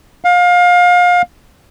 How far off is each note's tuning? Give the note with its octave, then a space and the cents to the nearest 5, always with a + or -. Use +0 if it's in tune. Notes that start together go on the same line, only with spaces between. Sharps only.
F5 +30